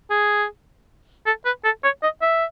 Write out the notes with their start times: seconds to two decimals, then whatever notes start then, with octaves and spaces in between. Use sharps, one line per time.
0.10 G#4
1.26 A4
1.45 B4
1.64 A4
1.84 C#5
2.03 D#5
2.22 E5